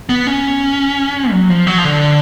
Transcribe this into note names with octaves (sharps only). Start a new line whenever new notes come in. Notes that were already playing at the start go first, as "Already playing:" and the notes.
B3
C#4
F#3
F3
F#3
F3
D3